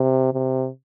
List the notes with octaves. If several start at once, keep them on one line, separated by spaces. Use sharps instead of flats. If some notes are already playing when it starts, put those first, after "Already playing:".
Already playing: C3
C3